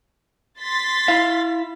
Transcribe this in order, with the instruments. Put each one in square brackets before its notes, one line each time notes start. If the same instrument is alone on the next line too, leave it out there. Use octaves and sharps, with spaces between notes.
[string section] C6 A6 B6
[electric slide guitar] E4 F5